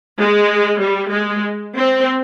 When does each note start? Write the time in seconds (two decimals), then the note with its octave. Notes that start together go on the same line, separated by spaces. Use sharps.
0.19 G#3
0.81 G3
1.13 G#3
1.77 C4